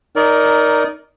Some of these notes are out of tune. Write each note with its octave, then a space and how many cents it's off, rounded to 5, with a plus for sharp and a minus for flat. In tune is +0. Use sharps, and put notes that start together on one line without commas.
D#4 +0 A#4 +10 D5 -25